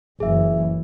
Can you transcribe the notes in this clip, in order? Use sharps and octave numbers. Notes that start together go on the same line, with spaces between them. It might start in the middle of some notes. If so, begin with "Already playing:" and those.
F#1 E3 G#4 E5